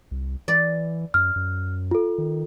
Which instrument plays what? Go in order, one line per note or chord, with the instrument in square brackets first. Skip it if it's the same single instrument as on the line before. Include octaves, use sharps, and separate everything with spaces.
[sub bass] C2
[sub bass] E3 [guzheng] D5
[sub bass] F#2 [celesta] F6
[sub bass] F#2
[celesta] F4 A4
[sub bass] D#3